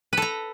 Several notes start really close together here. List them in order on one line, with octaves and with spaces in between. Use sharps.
B4 A4 A#5